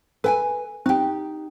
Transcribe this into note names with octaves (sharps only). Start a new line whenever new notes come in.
A4 B4 G5 G#5
C4 D#4 G4 G5